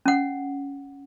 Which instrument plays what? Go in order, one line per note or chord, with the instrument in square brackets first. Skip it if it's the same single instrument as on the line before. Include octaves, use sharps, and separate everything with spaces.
[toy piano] C#4 F#5